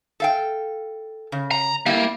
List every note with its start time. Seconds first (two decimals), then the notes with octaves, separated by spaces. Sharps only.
0.20 A4 F5 G5
1.32 C#3
1.51 A#5
1.86 G3 A#3 E4